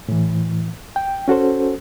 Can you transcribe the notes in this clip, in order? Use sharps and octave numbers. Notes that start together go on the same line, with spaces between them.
A2 E3
G5
C#4 F#4 A4 C5